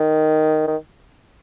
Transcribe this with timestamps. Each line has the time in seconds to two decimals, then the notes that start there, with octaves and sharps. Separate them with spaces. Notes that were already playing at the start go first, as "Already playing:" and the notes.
Already playing: D#3
0.67 D#3